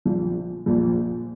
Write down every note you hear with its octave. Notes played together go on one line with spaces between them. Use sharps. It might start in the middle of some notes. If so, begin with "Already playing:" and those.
A#1 A#2 F3
A#1 A#2 F3